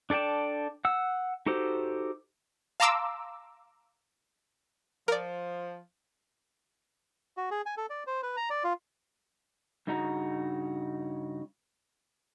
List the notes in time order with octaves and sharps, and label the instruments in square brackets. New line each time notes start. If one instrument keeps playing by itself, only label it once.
[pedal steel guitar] D4 A4 D5 G5 A5
F#5 E6
D#4 F#4 G4 A4 C5
[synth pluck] F5 A5 A#5 C6 D6 E6
[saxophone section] F3 [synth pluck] A#4 D5
[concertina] F#4
G#4
G#5
A4
D5
C5
B4
A#5
D5
F4
[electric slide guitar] G2 C#3 D#4 F#4 A#5